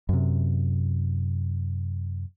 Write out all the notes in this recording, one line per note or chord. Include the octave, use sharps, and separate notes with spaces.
F#2 C3